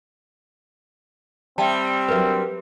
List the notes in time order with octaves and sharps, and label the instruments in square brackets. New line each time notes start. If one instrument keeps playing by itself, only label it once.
[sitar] G3 [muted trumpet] C4 [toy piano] E5 G5 A5
[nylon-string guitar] F#3 D4 A#4 [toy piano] B4 E5